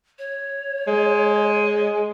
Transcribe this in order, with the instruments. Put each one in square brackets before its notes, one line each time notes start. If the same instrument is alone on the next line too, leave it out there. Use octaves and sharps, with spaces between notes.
[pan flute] C#5
[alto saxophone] G#3